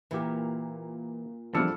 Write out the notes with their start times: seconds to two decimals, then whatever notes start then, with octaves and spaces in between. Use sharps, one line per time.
0.11 A#2 E3 G4
1.55 E2 F3 G3 D4 A4 F6 C#7